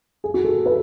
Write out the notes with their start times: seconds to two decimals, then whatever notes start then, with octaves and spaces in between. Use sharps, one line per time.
0.24 G#4
0.34 F#4
0.45 A4
0.66 B4